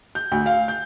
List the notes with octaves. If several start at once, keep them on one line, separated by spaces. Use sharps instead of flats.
G6
D2
F5
G6